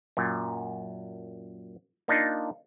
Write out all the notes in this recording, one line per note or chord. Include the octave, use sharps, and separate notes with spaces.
F#2 A#2
A#3 D4 D#4 F4